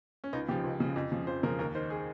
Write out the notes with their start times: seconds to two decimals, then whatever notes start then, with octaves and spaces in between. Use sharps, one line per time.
0.24 C#4
0.33 C#2 D#4
0.49 C#3 F3 G4
0.64 C#2
0.80 C#3 F3
0.96 F2
1.12 C#3 F3
1.27 F2 C5
1.43 C#3 F3 A#4
1.59 D#2 A#4
1.75 D#3 C5
1.90 G#4